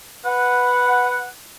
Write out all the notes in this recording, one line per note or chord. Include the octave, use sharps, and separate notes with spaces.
B4 F#5